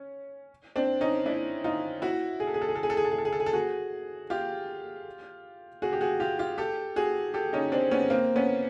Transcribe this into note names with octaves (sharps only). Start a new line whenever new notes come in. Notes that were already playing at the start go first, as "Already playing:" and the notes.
Already playing: C#4
C4 D4
C#4 D#4
D4 E4
D#4 F4
E4 F#4
G#4
A4
G#4
A4
G#4
A4
G#4
A4
G#4
A4
G#4
A4
G#4
A4
G#4
A4
F#4 G#4
F4 G4
F#4 G#4
G4
F#4 G#4
F4 G4
F4 G4
G4 A4
F#4 G#4
G4 A4
C#4 D#4
C4 D4
B3 C#4
A#3 C4
B3 C#4